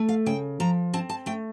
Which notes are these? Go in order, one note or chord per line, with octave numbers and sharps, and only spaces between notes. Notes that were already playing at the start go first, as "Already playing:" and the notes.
Already playing: A3
F5
C#3 G5
F3 A#5
C4 A5
A5
A3 G5